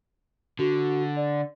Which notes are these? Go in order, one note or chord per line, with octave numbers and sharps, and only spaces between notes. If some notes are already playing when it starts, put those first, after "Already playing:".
D3 F#4
D5